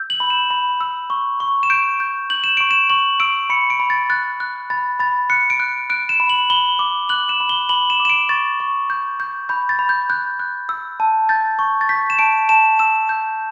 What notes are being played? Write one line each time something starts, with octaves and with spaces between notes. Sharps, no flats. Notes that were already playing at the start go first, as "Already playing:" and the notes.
Already playing: E6 G6
F#7
B5
E7
B5
E6
C#6
C#6
E7
G6 D7
G6
G6 F#7
E7
C#6 D7
E7
C#6 F#7
E6 D7
B5 C#7
D7
B5
A6
F#6 A6
F#6
B5 A6
B5 A6
F#6 C#7
D7
F#6
F#6 D7
E7
B5
F#7
B5 G7
D6
F#6 F#7
E7
B5
G7
B5 F#7
E7
D6
E7
D7
C#6 A6
C#6
G6
G6
B5 G6
A6
B5
G6
F#6 G6
F#6
E6
A5
G6 A6
C#6
A6
G6 B6
E7
A5 D7
A5 E7
E6 E7
G6